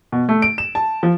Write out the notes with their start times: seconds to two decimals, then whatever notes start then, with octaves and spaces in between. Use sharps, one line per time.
0.12 B2
0.29 A3
0.42 D7
0.58 E7
0.75 A5
1.03 F3